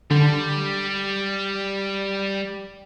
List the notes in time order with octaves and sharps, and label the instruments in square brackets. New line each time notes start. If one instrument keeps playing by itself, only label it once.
[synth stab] D3 [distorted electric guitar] G3